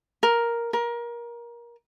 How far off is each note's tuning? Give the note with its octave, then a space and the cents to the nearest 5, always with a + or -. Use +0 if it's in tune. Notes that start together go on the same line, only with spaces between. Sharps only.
A#4 +5
A#4 +25